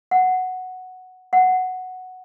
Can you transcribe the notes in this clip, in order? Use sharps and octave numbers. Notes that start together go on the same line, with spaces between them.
F#5
F#5